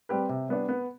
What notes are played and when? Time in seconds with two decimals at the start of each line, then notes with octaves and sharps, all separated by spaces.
0.09 G3 C4 G4 B4
0.29 C3
0.49 G3 B3 D4
0.69 B3